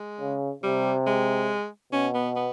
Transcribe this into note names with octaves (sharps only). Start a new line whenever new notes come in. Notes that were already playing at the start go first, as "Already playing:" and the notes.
Already playing: G#3
C#3
C3 G3
G#3
B2 C#4
B3
B3